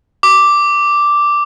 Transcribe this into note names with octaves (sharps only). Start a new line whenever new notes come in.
D6